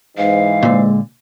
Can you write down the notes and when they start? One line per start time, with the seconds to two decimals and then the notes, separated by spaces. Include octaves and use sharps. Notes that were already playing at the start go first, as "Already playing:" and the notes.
0.18 G#2 E3 F5
0.63 A#2 D3 G#3